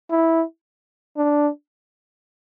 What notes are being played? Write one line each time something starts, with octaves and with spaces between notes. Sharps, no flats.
E4
D4